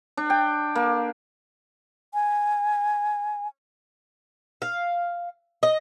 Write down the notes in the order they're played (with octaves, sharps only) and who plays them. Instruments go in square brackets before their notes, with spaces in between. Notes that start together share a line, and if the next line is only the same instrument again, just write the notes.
[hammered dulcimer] D4
G5
A#3
[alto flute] G#5
[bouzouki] F5
D#5